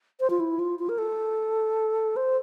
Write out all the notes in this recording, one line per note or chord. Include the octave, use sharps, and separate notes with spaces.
C5
F4
E4
F4
F4
A#4
A4
C5